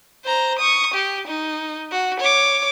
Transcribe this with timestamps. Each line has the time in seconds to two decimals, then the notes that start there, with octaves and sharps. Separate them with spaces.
0.25 C5 A#5
0.59 C#6 D#6
0.94 G4
1.28 D#4
1.91 F#4
2.20 C#5 D6